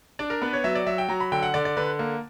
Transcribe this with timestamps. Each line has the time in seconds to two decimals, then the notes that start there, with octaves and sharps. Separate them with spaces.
0.19 D4 D5
0.30 A#4
0.42 B3 B4
0.53 C#5
0.64 F#3 E5
0.75 D5
0.87 F#3 E5
0.98 G5
1.09 F#3 A#5
1.20 B5
1.32 D3 G5
1.43 F#5
1.54 D3 D5
1.65 D5
1.77 D3 B4
1.99 A#3